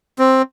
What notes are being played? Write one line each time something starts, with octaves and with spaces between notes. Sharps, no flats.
C4